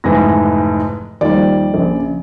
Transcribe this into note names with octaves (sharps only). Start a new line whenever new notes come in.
F1 G#2 E3 A#6
D#2 F3 G3 D5
A#1 C#3